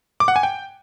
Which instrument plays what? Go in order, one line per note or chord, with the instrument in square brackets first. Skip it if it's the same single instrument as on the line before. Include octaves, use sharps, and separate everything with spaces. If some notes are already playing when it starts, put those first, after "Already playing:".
[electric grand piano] D6
F#5
G#5
G5